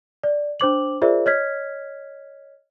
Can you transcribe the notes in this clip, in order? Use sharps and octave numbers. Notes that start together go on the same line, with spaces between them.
D5
D4 C5 D6 F#7
F4 G#4 A#4 C5 D5 E5
C#5 D#5 F6 G#6 B6